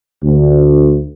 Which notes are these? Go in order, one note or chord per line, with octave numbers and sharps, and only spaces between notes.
D2